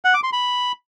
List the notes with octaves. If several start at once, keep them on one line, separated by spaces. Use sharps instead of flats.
F#5
D6
C6
B5